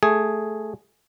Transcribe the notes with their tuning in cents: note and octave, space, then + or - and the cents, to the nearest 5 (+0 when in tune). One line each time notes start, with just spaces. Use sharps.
A3 -10 G#4 +0